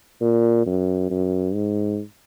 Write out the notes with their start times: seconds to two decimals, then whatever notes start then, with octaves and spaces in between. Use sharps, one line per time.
0.21 A#2
0.66 F#2
1.11 F#2
1.54 G#2